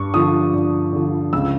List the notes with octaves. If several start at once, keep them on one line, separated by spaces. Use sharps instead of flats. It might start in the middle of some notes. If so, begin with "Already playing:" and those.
Already playing: G2 C#6
D3 F3 D#6
G2
D3 F3
C#2 E6